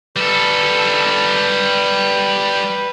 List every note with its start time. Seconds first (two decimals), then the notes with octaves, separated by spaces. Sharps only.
0.16 G3 A4 B4